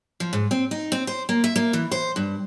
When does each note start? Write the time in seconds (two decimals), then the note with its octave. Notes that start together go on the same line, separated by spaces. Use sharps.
0.20 F3
0.33 G#2
0.51 C4
0.71 D#4
0.92 C4
1.07 C5
1.29 A#3
1.44 E5
1.56 A#3
1.73 E3
1.91 C5
2.16 G2